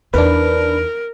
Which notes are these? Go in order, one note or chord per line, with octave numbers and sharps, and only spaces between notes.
E2 D4 D#4 A#4 B4